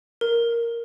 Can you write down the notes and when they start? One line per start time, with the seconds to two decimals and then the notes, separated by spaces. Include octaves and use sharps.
0.21 A#4